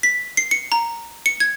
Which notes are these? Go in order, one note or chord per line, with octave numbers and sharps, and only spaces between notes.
B6
C7
C#7
A#5
C#7
G#6